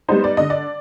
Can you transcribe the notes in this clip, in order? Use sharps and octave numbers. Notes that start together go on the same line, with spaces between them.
G3 B3 D#4 C5
D5
D3 D#5
D5